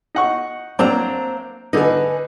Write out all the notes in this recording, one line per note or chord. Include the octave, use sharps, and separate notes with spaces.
D#4 F#5 C#6
F#3 A#3 C4 D4 C5 A#5
D3 D#4 B4 G#5